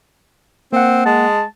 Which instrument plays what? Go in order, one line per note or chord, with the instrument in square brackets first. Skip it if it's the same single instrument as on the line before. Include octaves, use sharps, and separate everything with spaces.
[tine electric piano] A#3 F#5 [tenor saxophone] C4
[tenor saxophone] G#3 [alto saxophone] A5